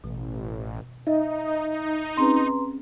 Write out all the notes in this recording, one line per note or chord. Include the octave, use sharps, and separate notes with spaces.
A1 B2
D#4 D#5 E5
C4 C#4 G#4 B4 A#5 C6